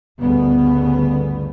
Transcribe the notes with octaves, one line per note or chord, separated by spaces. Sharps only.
G1 D2 C#3 B3